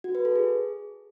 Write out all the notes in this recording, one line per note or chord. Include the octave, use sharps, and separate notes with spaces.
F#4
B4
A4
G#4